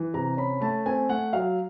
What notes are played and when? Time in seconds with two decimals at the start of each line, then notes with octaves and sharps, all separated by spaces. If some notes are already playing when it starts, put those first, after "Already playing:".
Already playing: E3
0.14 C3 A#5
0.37 C#4 B5
0.61 A3 A5
0.86 C4 G#5
1.09 A3 F#5
1.33 F#3 F5